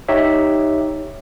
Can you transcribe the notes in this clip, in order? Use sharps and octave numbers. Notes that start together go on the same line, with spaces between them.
D#4 G4 C#5 E5